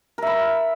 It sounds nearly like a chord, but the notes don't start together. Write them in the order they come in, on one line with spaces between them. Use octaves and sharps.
A#4 E5 B5